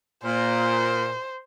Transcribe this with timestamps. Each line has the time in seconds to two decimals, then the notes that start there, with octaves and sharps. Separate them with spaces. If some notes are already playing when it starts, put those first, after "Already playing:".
0.25 A#2 C5